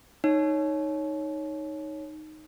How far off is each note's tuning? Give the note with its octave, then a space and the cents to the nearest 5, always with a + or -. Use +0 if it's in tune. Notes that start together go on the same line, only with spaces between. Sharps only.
D#4 +0 C#5 +0